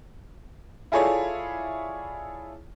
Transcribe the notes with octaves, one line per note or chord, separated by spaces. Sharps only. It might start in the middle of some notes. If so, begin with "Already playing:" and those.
E4 F4 G#4 A4 C#5 D5